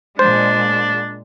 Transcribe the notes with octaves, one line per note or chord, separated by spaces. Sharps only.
A#2 G#3 D4 C5